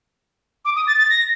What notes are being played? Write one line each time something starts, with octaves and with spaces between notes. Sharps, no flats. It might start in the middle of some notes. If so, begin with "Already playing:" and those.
D6
D#6
A6
A6
A#6